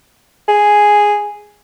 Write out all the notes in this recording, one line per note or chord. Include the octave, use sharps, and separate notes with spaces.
G#4